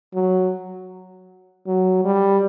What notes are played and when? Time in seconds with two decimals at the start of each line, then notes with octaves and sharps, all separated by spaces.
0.14 F#3
1.67 F#3
2.05 G3